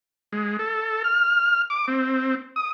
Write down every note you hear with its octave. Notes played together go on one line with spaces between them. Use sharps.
G#3
A4
F6
D6
C4
D#6